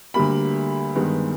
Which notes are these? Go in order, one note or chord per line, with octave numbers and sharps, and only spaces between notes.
D2 D3 G3 A#3 B5
G2 D#3 G#3 B3